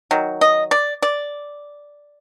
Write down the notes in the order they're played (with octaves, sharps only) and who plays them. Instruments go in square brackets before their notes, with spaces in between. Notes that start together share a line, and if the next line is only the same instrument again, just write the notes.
[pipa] D#3 F#3
D#5
D5
D5